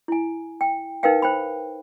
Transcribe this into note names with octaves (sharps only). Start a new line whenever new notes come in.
E4 G#5
G5
D#4 A#4 B4 F5 G5
C5 G5 B5